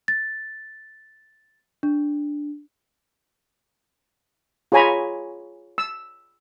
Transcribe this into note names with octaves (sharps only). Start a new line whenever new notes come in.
A6
D4
F4 G#4 C#5 G#5 A#5 B5
E6